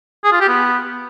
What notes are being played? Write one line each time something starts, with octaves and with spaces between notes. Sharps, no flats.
G#4
F4
G4
B3